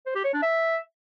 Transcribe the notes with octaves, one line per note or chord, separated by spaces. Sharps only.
C5
G4
C#5
D4
E5